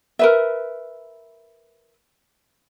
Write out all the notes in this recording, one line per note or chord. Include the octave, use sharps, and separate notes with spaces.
A#4 B4 E5